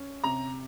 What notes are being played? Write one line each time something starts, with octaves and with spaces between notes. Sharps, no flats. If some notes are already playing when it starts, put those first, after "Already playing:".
Already playing: C#4
C3 A#5